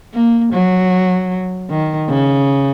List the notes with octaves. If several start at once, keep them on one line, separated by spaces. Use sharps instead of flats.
A#3
F#3
D#3
C#3